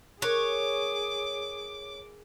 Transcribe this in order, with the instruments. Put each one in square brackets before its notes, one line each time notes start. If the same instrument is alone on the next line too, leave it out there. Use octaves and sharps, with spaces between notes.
[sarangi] G#4 [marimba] A#4 F#6 [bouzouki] C#5 [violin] D6